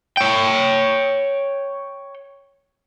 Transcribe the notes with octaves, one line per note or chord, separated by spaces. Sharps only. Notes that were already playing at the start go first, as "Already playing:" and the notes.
C#5 G5